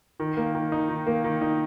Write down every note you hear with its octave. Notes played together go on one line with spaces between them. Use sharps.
D#3
A#3
D#3
D#4
D#3
A#3
D#3
D#4